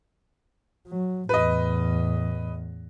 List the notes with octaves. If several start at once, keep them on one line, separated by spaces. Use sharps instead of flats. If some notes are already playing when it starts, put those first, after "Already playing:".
F#3
E2 A2 B4 D#5